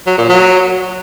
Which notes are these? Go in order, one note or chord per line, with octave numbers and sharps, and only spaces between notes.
F#3
A#2
F#3